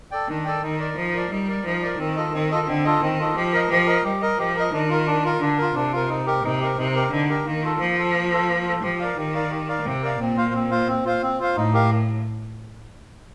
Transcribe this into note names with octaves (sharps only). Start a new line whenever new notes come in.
A4 D5 G5
D#3 D4
A4 D5 G5
D#3 D#4
A#4 D5
F3 D#4
A#4 D5
G3 D#4
A#4 D5
F3 D#4
A#4 D5
D#3 C4
F4 A4 D#5
D#3 C4
F4 A4 D#5
D3 C4
F4 A4 D#5
D#3 C4
F4 A4 D#5
F3 G4
A#4 D#5
F3 G4
A#4 D#5
G3 G4
A#4 D#5
F3 G4
A#4 D#5
D#3 D4
F4 A#4
D4
F4 A#4
D3 D4
F4 A#4
C3 D4
F4 A#4
D#4
G4 A#4
C3 D#4
G4 A#4
C3 D#4
G4 A#4
D3 D#4
G4 A#4
D#3 A#3
F4 A4
F3 A#3
F4 A4
A#3
F4 A4
A#3
F4 A4
F3 G4
A#4 D5 F5
D#3 G4
A#4 D5 F5
G4
A#4 D5 F5
C3 G4
A#4 D5 F5
A#2 C4
F4 C5 F5
C4
F4 C5 F5
C4
F4 C5 F5
C4
F4 C5 F5
A2 D#4
G4 A#4 F5